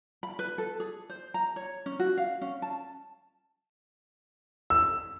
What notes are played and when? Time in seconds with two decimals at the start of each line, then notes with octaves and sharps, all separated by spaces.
0.23 B5
0.39 B4
0.58 A4
0.80 G#4
1.10 C5
1.34 A#5
1.56 C#5
1.86 C#4
1.99 F#4
2.17 F5
2.41 C#4
2.62 A5
4.70 E6